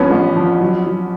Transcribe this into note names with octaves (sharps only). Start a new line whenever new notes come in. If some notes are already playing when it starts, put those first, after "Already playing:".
Already playing: G2 F3 B3 C#4
A1
F3
F#3
F#3